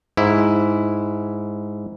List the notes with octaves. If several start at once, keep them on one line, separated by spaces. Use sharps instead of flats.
G#2 E4